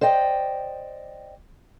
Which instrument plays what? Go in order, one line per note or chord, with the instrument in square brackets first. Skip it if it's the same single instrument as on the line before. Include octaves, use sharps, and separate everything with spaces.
[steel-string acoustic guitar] C5 D5 D#5 G5